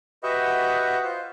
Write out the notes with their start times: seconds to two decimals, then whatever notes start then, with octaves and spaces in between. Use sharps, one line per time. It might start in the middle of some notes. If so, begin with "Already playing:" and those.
0.23 F#4 G4 B4 D#5 E5 F#5
1.04 F4 C5